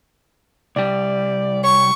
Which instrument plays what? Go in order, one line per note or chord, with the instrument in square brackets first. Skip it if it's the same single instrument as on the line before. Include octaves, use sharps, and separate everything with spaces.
[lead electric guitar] C2 G3 [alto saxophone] D5
[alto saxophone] C#5 [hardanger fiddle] C#6